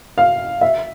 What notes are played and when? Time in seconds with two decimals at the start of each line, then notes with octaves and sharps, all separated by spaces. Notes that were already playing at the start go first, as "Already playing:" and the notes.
0.18 F5
0.61 E5